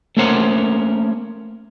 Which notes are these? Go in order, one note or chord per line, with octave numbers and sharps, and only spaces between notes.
A3 A#3 C#4 A#4 C5 F#5